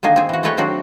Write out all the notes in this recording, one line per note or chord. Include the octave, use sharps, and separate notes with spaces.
D3 D#3 A#3 G#4
C4 G#4
E3 F#4
G#3 A3 A4 B4 C#5 G5
D#3 F#3 C4 D4 F#4